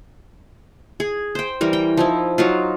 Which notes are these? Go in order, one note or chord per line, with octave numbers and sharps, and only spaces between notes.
G#4
C5 G5
E3 G3 A#4
G5
F3 D#4 E4
F#3 D#4 F4